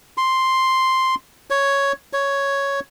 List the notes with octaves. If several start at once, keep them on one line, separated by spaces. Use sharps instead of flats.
C6
C#5
C#5